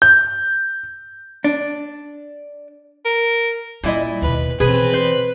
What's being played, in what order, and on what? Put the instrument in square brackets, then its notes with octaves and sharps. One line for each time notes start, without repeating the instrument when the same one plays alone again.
[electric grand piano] G6
[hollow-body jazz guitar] D4
[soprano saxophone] A#4
[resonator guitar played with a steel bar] A#2 E4 D#5 [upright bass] G3
[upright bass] D#2 B2 [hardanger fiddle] B4
[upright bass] B2 E3 [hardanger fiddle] C4 B5 [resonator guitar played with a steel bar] G#4 [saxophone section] B4
[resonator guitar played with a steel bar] C5